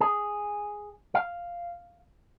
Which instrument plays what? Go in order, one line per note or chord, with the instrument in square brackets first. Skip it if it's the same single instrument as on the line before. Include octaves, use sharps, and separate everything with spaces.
[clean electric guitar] G#4
F5